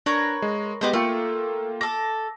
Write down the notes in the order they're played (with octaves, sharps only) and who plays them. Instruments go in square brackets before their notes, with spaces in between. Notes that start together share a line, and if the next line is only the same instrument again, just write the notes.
[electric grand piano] D4 [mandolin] A#4 B4 C#5
[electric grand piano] G#3
[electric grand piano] G#3 B3 G4 [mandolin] B4 C5 D#5
[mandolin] A3 [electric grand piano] A#3 F4 G5
[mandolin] A4 D6 [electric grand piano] A#6